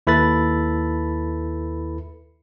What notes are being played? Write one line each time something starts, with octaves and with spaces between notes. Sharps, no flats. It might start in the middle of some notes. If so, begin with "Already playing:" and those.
D#2 E4 A4 B4 B5 A6